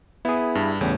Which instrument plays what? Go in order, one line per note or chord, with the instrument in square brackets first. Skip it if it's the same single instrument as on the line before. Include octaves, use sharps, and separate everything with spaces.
[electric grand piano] B3 [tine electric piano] E4 G#4
[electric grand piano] G2
[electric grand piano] E2 [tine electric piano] A2 C#3 G3